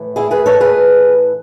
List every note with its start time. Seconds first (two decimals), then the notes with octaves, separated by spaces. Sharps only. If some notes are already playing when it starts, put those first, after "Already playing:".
Already playing: A2 E3
0.16 E4 G#4
0.31 G#4 B4
0.46 A4 C#5
0.60 G#4 B4